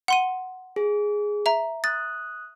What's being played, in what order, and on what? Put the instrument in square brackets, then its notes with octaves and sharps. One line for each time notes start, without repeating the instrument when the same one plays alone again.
[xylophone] F#5 C6 D#7
[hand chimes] G#4
[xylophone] E5 A#5
[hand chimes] D#6 F#6 [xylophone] A6